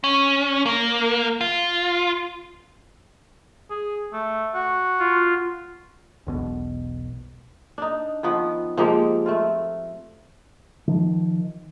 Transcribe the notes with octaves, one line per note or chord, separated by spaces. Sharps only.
C#4
A#3
F4
G#4
A3
F#4
F4
E1 B1 B2
D4 D#4
D#3 F3 B3
F3 G#3 A#3 G4
A3 C4 F4
D#3 F3